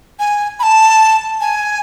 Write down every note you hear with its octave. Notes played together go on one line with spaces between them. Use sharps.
G#5
B5
A5
G#5